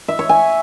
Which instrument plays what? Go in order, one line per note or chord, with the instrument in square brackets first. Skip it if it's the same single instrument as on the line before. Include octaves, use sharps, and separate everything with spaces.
[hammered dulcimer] E5
C#5
G#5